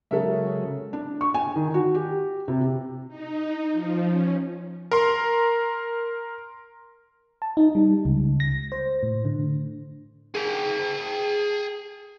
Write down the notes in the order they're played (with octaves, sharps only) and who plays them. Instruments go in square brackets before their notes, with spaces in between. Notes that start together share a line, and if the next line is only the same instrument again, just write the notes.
[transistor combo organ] C#3 F#3 G#3 [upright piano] A4 A#4 E5
[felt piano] D4
C#6
G#5
D#3
F#4
G4
C3
[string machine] D#4
F3
C#4
[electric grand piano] A#4 A#5 C6
[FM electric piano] A5
D#4
G3
C#2
A#6
C5
A2
D3
[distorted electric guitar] G#4 G5